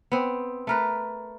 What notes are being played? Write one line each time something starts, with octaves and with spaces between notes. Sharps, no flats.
B3 C4
A3 A#4 B4